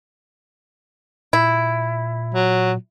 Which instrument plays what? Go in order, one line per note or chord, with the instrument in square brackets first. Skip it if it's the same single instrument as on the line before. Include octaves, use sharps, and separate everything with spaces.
[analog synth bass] A#2 [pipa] E4
[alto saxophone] F#3